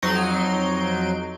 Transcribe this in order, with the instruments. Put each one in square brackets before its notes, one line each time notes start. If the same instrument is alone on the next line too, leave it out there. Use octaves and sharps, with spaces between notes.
[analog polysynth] F2 F#3 D#4 C6 D7